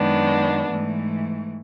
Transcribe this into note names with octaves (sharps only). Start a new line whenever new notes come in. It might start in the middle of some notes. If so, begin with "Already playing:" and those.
Already playing: F#2 D#3 G#3 B3 D4
G#2 E3 A3